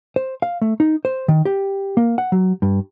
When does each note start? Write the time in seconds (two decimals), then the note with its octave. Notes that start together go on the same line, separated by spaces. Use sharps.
0.16 C5
0.42 F5
0.62 A3
0.80 D#4
1.05 C5
1.28 D#3
1.45 G4
1.97 A#3
2.18 F#5
2.32 F#3
2.62 G2